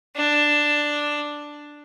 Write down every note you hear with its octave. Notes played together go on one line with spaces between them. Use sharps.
D4